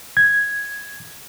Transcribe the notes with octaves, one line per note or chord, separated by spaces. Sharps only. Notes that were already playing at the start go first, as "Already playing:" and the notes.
G#6